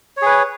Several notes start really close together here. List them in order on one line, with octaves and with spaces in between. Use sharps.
C#5 G#4 B4